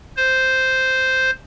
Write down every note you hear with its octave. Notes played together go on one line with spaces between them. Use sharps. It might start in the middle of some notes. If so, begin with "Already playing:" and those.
C5